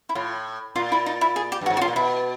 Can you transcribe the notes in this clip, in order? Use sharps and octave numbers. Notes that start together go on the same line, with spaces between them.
E4
A2 F4
A#2 F4
E4
D#4
E4
G#4
G4
G2
F#4
G#2
A2 F4 F#4
A#2
B2 E4